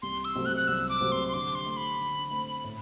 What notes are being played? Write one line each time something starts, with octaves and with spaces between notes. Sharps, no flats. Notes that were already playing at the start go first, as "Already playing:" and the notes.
C2 C6
E6
C3 F#3 A3 C4
F#6
F#6
C2 E6
D6
C3 F#3 A3 C4
C6
C6
D3 D6
C6
A3 C4
B5
D3
A3 C4
A2